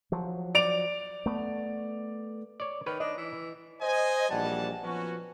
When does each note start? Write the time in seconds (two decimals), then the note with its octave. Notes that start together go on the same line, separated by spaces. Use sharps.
0.12 F3 F#3
0.55 D5 D7 F7
1.26 A3 B3
2.60 C#5 D5
2.86 D#3 B4 C#5
3.00 D4 D#5
3.17 E3
3.81 C5 D#5 G#5
4.30 A#1 E3 G3 F#5 A5
4.83 F3 F#3 B3 C#4 F#4